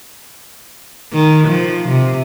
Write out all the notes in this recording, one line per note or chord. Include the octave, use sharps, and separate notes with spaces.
D#3
F3
C3